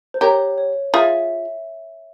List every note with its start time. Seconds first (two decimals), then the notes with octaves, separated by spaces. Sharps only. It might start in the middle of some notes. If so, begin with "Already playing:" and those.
0.14 C5
0.21 G4 A#4 C#5
0.58 C#5
0.94 F4 G#4 E5